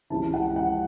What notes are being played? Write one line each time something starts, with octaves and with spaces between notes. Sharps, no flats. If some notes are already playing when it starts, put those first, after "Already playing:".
C#2 C#3 E3 A5
F#5
F#5